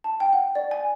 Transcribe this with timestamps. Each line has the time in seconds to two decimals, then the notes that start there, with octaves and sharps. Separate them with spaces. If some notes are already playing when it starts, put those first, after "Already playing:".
0.04 A5
0.20 G5
0.33 F#5
0.55 D5
0.71 G#5